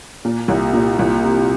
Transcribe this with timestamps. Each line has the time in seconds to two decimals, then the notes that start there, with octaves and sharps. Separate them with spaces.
0.25 A#2
0.48 C2
0.73 A#2
0.99 C2
1.24 C3